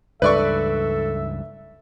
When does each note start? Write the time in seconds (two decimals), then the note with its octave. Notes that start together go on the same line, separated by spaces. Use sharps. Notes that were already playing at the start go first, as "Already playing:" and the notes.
0.22 C#2 G2 A4 B4 D5 E5 C#6